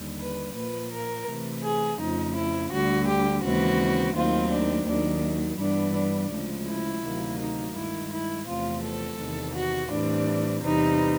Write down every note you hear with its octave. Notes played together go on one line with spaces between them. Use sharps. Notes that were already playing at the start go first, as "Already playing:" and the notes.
Already playing: D#2 D3 G3
B4
A#2 F3 A#3 B4
A#4
C3 E3 A3
G#4
F2 C#3 F3 A3 D#4
E4
D2 D3 G3 F#4
G4
D#2 C#3 E3 G#3 C4 F#4
D#2 D#3 F#3 A3 C4 F4
D4
D#2 D#3 F#3 D4
G2 E3 G3 B3 D4
D4
D2 C#3 F3 G#3
E4
D2 C3 D#3 F#3 A#3
D#4
G2 D#3 G#3 E4
E4
E2 C3 F3 A3 C4 F4
A4
E2 C3 D#3
F#4
A2 E3 G3 C4 D4
E2 C3 E3 G3 D#4